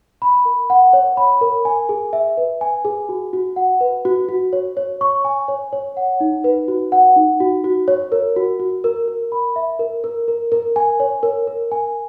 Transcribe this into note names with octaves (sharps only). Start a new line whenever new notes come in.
B5
A#4
F#5
C#5
B5
A#4
G#5
G#4
E5
B4
G#5
G#4
F#4
F#4
F#5
B4
F#4
F#4
C#5
C#5
C#6
G#5
C#5
C#5
F#5
D#4
B4
F#4
F#5
D#4
F#4
F#4
C#5
A#4
F#4
F#4
A#4
A#4
B5
E5
A#4
A#4
A#4
A#4
G#5
C#5
A#4
A#4
G#5